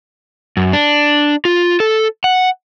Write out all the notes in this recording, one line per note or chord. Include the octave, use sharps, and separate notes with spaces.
F#2
D4
F4
A4
F#5